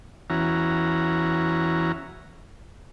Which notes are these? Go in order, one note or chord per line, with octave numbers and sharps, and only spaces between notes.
E2 E3 C#4 F#4 A#5